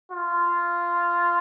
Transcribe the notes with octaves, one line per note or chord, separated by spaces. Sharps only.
F4